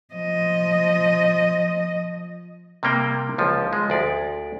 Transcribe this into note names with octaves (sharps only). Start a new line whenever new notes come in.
F3 D#5
C3 G3 A#3 G5
C#2 F3
G#3
D2 D5